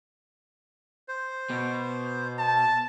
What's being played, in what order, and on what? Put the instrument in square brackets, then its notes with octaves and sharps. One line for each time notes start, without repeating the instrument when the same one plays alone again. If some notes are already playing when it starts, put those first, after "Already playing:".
[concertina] C5
[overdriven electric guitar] B2
[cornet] A5